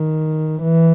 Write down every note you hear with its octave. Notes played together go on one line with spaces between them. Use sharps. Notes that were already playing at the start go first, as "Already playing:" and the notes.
Already playing: D#3
E3